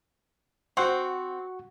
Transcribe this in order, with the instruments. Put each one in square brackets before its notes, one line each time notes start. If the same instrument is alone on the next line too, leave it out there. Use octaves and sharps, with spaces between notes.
[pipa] C4 [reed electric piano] F#4 F#5 C#6